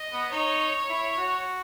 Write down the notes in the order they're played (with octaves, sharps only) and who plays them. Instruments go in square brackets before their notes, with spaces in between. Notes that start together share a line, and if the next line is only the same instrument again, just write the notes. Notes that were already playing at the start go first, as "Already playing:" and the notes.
Already playing: [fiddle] D#5
[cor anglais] B3
[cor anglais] D#4 [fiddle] C#5
[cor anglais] E4
F#4